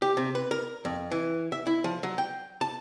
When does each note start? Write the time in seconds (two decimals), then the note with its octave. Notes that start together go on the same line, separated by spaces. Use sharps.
0.02 G4
0.17 C3
0.35 B4
0.51 A#4
0.85 F2
1.11 E3
1.52 E5
1.67 E4
1.84 F3
2.03 F#3
2.18 G5
2.61 A5